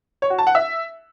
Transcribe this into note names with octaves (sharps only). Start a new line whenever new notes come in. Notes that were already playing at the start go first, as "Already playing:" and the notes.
C#5
F#4
A5
F#5
E5